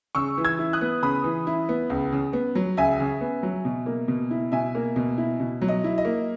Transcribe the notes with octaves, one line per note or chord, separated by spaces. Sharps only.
C#3 C#6 E6
E3
E6 G#6
E4
D#6 F#6
B3
C#3 B5 D#6
E3
E4
B3
C#2
C#3
B3
F#3
C#2 E5 G#5
C#3
B3
F#3
B2
A#3
B2
E4
B2 E5 G#5
A#3
B2
E4
B2
F#3
D#5
E4
D#5
A#3